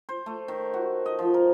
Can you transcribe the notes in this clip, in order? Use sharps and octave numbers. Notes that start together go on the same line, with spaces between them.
C5
A3
D#3
F#4
D#5
F3
A#4